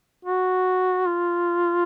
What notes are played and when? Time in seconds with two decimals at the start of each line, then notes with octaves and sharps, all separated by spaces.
0.25 F#4
1.07 F4